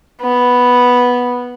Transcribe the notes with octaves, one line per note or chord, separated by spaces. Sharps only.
B3